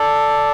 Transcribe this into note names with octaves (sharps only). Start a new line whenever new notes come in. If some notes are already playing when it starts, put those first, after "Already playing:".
Already playing: A4 D5